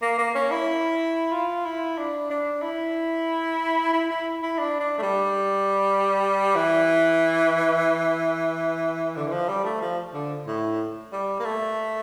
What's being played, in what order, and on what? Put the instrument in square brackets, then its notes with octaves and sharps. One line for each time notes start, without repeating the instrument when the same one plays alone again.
[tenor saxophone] A#3
A#3
C#4
E4
F4
E4
D4
D4
E4
E4
E4
E4
D4
D4
A3
G3
E3
D3
E3
F3
G3
A3
F3
D3
A2
G3
A#3
A3